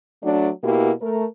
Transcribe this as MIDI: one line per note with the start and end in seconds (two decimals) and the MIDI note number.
0.22 0.49 54
0.22 0.49 57
0.22 0.49 62
0.63 0.91 47
0.63 0.91 58
0.63 0.91 64
0.63 0.91 67
1.01 1.24 57
1.01 1.24 70